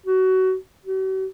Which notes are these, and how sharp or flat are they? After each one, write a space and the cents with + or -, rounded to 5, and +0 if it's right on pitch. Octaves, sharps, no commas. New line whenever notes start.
F#4 +20
F#4 +45